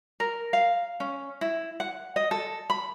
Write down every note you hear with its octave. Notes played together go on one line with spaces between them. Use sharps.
A#4
F5
C#4
E4
F#5
D#5
A4
B5